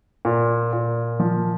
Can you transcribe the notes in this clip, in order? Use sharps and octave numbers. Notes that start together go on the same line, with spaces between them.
A#2
A#2
F3